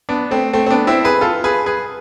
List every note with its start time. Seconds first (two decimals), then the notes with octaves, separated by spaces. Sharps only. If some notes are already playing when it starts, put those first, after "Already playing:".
0.09 B3 D4
0.31 A3 C4
0.53 A3 C4
0.66 C4
0.70 B3 D4
0.87 C4 E4
1.04 G#4 B4
1.21 F4 A4
1.44 G#4 B4
1.66 G#4 B4